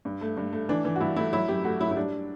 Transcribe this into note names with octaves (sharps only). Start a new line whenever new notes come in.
G2
A3
G2
A3
E3 D4
E3
F#4
G2 E4
A3 E4
F#3 E4
F#2 G4
A3 F#4
F#3 E4
E4
G3 D4